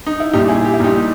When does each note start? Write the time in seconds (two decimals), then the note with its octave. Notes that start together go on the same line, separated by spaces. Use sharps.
0.07 D#4
0.20 E4
0.33 A#1 A#2 G3 D#4 G4
0.48 E4 G#4
0.65 G4
0.74 E4
0.80 A#1 A#2 G3 D#4 G4